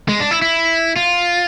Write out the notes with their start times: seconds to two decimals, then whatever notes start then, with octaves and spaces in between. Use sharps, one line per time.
0.09 G#3
0.20 D4
0.31 E4
0.42 E4
0.96 F4